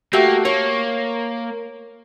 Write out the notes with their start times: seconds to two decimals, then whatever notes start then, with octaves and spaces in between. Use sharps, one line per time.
0.13 A3 A#3 F#4 G4
0.45 A#3 C#5